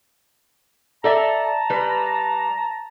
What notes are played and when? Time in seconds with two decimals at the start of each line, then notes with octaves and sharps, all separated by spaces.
1.04 A4 D5 E5 A5 A#5
1.70 G3 B4